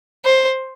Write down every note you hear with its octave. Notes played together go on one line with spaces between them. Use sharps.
C5